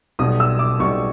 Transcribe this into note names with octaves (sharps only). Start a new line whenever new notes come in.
B1 B2 G3 D#6
E6
D6
B1 B2 G3 C#6